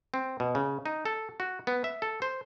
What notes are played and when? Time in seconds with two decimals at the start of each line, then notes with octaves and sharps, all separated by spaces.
0.14 C4
0.40 B2
0.55 C#3
0.86 D#4
1.05 A4
1.40 F#4
1.67 B3
1.84 E5
2.02 A4
2.22 C5